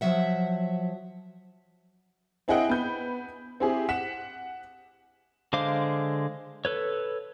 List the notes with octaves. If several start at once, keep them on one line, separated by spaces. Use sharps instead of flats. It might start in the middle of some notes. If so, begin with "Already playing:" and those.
F3 F#3 E5 F#5
C4 E4 G#4 D#5 F#5 G5
B3 G6
C4 E4 G4 G#4
F#5 B6 E7
D3 G#3 C5 F5 D6
A4 B4 C#5